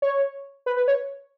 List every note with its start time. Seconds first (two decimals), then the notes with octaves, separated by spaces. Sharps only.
0.02 C#5
0.66 B4
0.77 B4
0.88 C#5